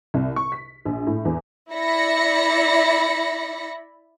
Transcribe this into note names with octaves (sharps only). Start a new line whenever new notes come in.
C2
C#6
B6
A#1
A2
E2
E4 D5 E5 B5 A#6 C#7